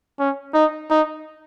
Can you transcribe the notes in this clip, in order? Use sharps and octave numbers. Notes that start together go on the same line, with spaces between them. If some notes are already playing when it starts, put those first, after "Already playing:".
C#4
D#4
D#4